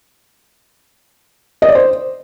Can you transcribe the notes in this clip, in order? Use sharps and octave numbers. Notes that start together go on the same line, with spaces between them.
D#5
D5
C5